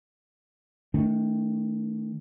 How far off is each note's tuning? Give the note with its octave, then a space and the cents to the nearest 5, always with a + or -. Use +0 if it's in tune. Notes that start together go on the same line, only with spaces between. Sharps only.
D#3 +15 A3 +0 D4 -35